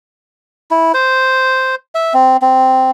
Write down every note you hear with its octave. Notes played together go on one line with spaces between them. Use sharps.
E4
C5
E5
C4
C4